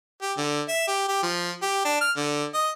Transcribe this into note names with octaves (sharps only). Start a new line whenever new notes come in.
G4
D3
E5
G4
G4
F3
G4
D4
F6
D3
D#5